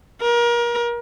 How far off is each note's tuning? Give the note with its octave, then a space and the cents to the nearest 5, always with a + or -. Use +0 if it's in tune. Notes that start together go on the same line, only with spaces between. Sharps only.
A#4 +30